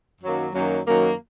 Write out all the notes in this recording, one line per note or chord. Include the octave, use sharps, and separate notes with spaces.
F#2 D#3 F#3 A#3
F#2 D#3 F#3 A#3
F#2 D#3 F#3 A#3